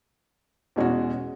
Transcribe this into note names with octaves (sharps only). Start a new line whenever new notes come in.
E2 B2 G#3 C#4 F#4